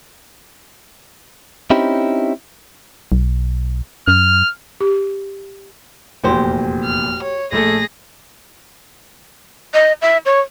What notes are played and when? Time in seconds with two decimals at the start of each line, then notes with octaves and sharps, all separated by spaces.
1.70 C4 C#4 D#4 E4 G4
3.12 B1
4.08 F#2 F6
4.81 G4
6.24 F1 E2 A#2 F#4 G4 C5
6.85 F6
7.23 C#5
7.52 A#1 A3 G#4 A4 A#6
9.74 D#5
10.02 E5
10.26 C#5